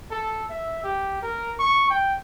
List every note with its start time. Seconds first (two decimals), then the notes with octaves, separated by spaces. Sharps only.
0.11 A4
0.50 E5
0.84 G4
1.22 A#4
1.59 C#6
1.90 G5